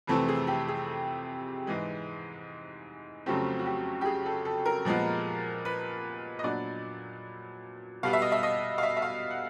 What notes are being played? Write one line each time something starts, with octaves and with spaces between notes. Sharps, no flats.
F2 C3 E3 A3 C4 A4
G#4
G4
G#4
G#2 E3 G#3
F2 C#3 F#3 A3 C4 G4
F#4
G4
G4
G#4
A4
A4
A#4
A#2 F3 G#3 B3
B4
D#5
A#2 F#3 B3 D4 D5
B2 G3 B3 F5
E5
D#5
E5
D#5
F5
E5
E5
F5
F#5